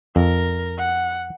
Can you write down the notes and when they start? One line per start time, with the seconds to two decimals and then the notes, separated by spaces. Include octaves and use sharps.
0.16 F2 A#4
0.78 F#5